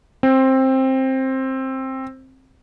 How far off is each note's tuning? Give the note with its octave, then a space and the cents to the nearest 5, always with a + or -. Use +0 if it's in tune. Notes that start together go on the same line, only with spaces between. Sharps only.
C4 +15